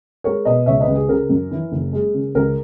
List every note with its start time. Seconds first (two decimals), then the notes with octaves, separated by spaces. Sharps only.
0.24 G#3 A#4 C#5
0.45 B2 B4 D#5
0.66 C#2 C#5 E5
0.80 B4 D#5
0.87 C#2
0.94 G#4
1.08 C#3 A#4
1.30 F#2
1.51 E3
1.72 F#1
1.93 G#3
2.14 C#3
2.35 C#2 A#4